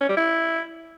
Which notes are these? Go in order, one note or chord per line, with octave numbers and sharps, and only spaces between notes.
C#4
G3
E4